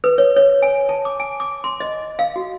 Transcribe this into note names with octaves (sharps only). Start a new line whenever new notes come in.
B4
C#5
C#5
G#5
A5
D6
G#5
D6
C6
D#5
F5
F#4